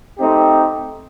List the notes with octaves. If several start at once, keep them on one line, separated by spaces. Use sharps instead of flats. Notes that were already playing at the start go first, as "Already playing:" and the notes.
A3 C4 D#4 G4